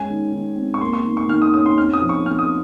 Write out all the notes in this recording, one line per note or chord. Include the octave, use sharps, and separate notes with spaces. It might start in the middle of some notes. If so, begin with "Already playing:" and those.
Already playing: G#3 C#4 G#5
D#3
D#3
C4
C#6
A#3 C6
C#6
D#3
C#6
D#3 F6
D#6
C#4 D#6
C6
C4 F6
D#6
F3
C#6
C4 F6
D#6